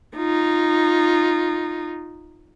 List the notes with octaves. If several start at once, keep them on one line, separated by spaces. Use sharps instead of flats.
D#4 F4